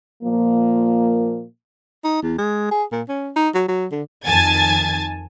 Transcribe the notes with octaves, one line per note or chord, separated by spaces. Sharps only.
A#2 F3 A#3
D#4
E2
G#3
G#4
A#2
C#4
D#4
F#3
F#3
D3
F2 D#3 G#5 A5 G#6 A6